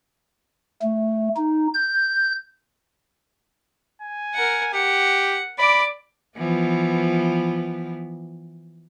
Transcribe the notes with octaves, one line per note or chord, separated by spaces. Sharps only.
A3
D#4
G6
G#5
A#4 F#5
G4 F#5
D5 B5 D6
E3 F3 B3